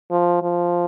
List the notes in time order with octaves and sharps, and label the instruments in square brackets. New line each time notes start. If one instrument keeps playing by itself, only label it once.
[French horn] F3
F3